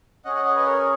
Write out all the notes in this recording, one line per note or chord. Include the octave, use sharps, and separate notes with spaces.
C#4 G#4 D#5 F#5
D#5 F#5
D#5 F#5
B4 D#5
A#4 C#5